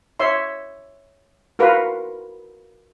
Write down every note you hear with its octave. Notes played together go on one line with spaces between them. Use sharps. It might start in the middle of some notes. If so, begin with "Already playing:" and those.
C#5 E5 C6
F4 F#4 A#4 B4 F5